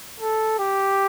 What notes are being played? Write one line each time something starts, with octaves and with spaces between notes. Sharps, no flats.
A4
G4